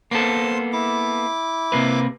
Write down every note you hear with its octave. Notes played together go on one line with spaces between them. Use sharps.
A#3 B3 A4 C5 C6
E4 D6
C3 A#3 B4